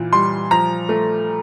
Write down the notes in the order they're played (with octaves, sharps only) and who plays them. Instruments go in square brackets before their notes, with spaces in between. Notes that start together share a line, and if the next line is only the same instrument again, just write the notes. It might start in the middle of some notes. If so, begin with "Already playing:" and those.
Already playing: [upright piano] A#2 E3
G3 C6
F3 A#5
A3